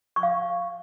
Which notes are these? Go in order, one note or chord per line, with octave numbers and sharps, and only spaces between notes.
C#6
F5
C#6